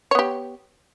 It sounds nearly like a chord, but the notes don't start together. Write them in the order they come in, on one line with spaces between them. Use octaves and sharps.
C#5 B3 G4